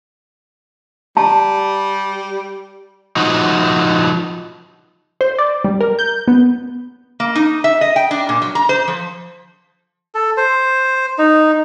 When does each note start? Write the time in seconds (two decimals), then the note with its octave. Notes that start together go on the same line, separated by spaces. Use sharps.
1.17 G3 A5
3.16 F3 D#4 F#4
5.21 C5
5.39 D5
5.64 G3
5.81 A#4
5.99 G6
6.28 B3
7.20 A#3
7.35 D#4
7.64 E5
7.81 D#5
7.96 G5
8.11 D4
8.29 A#2
8.42 F#3
8.55 A#5
8.69 C5
8.88 F3
10.15 A4
10.37 C5
11.18 D#4